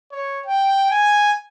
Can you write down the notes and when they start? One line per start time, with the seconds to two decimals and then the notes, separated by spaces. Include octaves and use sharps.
0.12 C#5
0.46 G5
0.91 G#5